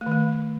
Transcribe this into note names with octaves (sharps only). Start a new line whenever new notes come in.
A3
D#3
A3